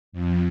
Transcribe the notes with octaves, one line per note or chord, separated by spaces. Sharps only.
F2